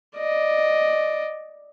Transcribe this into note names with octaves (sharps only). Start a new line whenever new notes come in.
D5 D#5